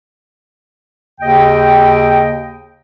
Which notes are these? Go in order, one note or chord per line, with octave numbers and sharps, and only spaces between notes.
D#2 C#3 D#5 G5